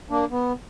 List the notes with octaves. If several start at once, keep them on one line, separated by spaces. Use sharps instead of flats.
A#3 D4
B3